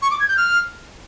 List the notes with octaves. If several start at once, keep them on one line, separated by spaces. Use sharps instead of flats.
C#6
D6
G#6
G6
F6